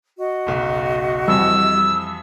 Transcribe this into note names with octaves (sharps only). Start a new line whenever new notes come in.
F#4 D#5
F#1 B1
F2 C3 E3 G3 E6